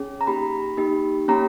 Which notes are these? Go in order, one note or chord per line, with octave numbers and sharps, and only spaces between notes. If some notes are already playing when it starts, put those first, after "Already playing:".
Already playing: C#4 G#4
A#5
A#3 D#4 G4 B5
A#3 D#4 G4
A#3 C#4 G4 A#5